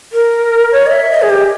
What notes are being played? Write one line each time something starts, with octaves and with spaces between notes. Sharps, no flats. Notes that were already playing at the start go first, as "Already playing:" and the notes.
A#4
C#5
D#5
E5
D#5
G#4
G4